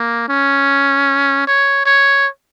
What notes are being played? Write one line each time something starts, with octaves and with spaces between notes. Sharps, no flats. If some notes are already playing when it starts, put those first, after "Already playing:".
Already playing: A#3
C#4
C#5
C#5